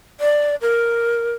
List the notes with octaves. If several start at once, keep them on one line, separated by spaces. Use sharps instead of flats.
D5
A#4